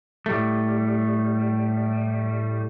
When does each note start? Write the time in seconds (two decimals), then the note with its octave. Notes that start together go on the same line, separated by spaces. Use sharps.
0.26 A2 G3 A3